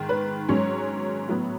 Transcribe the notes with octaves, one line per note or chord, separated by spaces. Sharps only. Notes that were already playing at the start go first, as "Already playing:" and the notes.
Already playing: G#2 D#3
B4
G#2 F#3 C#4 C#5
A2 F#3 B3